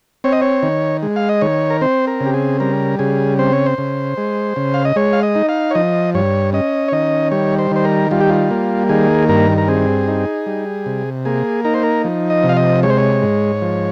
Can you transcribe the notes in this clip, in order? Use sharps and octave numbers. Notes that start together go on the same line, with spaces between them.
C4 C#5
D#5
C#5
D#3
G#3
F5
D#5
D#3 C#5
A#4
C4 C5
A#4
C#3
G4
G#4
G3 A#4
C#3 G#4
C4 C5
C#5
C5
C#3
G#3
C#3
F5
D#5
G#3 C#5
F5
D#5
D#4
F5
C#5
F3 D#5
G2 C#5
C#4 D#5
C#5
D#3 D#5
G3 C#5
C5
D#3 C5
A#4
G3 F4
G4
F4
A#3
D#3 G#4
G2 A#4
A#4
C4 G#4
D#4
G3
C3
A#3 G#4
D#4 A#4
C5
A#4
F3
D#5
C3
F5
D#5
G#3 C#5
C5
C#5
G#2
F3